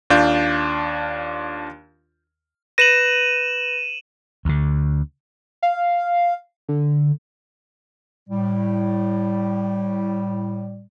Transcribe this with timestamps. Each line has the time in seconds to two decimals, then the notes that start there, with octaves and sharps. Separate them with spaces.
0.10 D#2 D4 F4 F5 G6
2.78 B4 A#6 D#7 E7 F#7
4.45 D2 D3
5.63 F5
6.69 D3
8.29 A2 G3